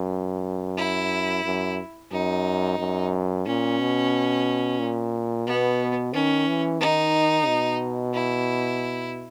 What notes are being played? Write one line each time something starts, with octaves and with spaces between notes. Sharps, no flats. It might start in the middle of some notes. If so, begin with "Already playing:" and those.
Already playing: F#2
E4
F#2
F#2 D#4
F#2
A#2 C#4
B2
A#2
B2 B3
D#3 C#4
E3
D#3 D#4
B2
E4